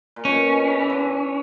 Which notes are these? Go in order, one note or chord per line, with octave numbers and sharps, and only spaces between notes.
A#2
B2 C#4
B2
C#3
E3
D3